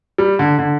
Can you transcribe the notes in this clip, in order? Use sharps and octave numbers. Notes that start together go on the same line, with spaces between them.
G3
D3
D3